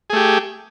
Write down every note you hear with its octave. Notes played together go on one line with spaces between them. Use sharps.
A3 G4 G#4